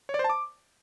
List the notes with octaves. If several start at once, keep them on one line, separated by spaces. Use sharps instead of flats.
C#5
D5
C5
A5
D6